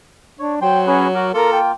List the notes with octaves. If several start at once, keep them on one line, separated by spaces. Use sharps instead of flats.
D4 C#5
F#3 C5 G5 C6
C#4 F#4 G#4 B4
F#4 A#4 D6
A#3 F4 A4 A#4
G5